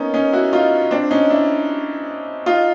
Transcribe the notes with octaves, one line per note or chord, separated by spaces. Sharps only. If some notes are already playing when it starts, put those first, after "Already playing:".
Already playing: A#3 B3 C#4 D#4
C#4 D#4
E4 F#4
D#4 F4
C4 D4
C#4 D#4
D4 E4
D#4 F4